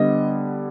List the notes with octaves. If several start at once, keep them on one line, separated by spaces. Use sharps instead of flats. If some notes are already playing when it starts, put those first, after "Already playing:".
Already playing: D3 G3 B3 D#5